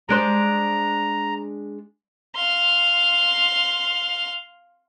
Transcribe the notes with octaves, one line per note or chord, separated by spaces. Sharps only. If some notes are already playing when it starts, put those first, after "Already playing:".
G#3 D4 C5 A#5
F5 C6